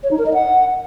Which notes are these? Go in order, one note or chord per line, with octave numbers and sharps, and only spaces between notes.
C#5
D#4
A#4
D#5
F#5